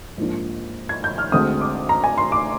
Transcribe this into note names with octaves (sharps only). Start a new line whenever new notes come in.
G#2 F3 A#3 D4
G#6
G6
F6
D2 D3 G#3 C4 D#6
D6
A#5
G#5
C6
D6